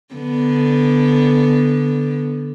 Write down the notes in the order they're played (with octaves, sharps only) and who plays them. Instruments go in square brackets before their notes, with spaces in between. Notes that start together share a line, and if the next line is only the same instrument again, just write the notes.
[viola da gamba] D3 B3